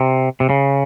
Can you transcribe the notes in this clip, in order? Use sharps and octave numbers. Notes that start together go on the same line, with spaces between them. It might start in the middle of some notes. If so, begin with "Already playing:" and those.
Already playing: C3
C3
C#3